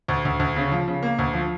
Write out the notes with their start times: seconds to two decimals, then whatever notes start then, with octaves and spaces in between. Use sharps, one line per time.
0.08 D2
0.25 D2
0.39 D2
0.56 C#3
0.72 F3
0.88 C#3
1.03 A#3
1.18 D2
1.34 F3